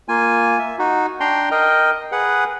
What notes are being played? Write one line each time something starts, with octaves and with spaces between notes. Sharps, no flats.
A#3 F4 G#5
E5
D#4 F#4
D4 G5 A#5 C6
A#4 D#5 G5
G#4 B4 F#5